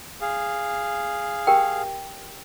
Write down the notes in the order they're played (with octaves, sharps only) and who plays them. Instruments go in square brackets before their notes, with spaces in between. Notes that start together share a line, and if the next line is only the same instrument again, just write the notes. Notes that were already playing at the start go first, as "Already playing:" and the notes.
[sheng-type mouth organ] G#4 F5
[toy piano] G4 A#4 G5